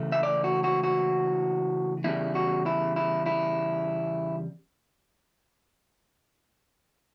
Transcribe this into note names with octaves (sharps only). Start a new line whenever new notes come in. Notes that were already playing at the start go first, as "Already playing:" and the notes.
Already playing: C#3 E3 A3 E4
E5
D5
F#4
F#4
F#4
E2 C#3 G3 E4
F#4
E4
E4
E4